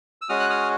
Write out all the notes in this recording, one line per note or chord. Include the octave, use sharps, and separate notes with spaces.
E6
G#3 C#4 F#4 D#6 F6
F#6
D#6 F6